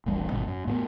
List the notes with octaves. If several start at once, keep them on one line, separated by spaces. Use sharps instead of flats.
D#1 A1 G3
G#1 C#2 B2 C4
F#2
A2 G3 B3